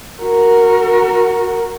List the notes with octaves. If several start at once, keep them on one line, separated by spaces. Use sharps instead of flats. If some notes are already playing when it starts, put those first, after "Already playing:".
F#4 A#4